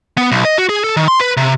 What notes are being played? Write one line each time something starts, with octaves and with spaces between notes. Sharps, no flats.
B3
B1
D#5
F#4
G#4
A4
D#3
C6
B4
C3